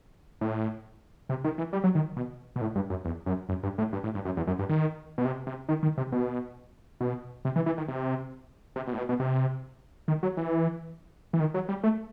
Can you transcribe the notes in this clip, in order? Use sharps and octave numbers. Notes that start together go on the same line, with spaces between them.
A2
C3
D#3
E3
G3
F#3
D#3
B2
B2
A2
G2
F#2
E2
F#2
F#2
G2
A2
G2
A2
G2
F#2
E2
F#2
G2
D#3
B2
C3
C3
D#3
D#3
C3
B2
B2
C3
E3
E3
D#3
C3
C3
B2
A2
B2
B2
C3
D#3
F#3
E3
E3
D#3
F#3
G3
A3